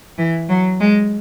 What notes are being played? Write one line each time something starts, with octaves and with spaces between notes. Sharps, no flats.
E3
F#3
G#3